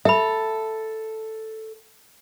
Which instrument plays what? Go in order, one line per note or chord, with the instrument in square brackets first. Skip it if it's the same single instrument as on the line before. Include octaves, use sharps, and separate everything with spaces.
[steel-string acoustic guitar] A4 [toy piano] E5 B5